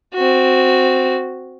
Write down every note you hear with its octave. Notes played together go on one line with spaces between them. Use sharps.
C4 F#4